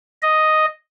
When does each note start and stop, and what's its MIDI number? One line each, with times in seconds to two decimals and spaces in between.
0.22 0.66 75